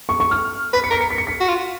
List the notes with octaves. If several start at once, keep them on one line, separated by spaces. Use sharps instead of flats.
C#6
C#6
F6
B4 B6
C#7
A#4 B6
C#7
B6
C#7
B6
F#4
F4